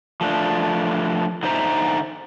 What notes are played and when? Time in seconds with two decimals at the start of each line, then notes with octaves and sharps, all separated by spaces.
0.21 F3 A3 D4
1.43 D3 D#4 C5 E5 A#5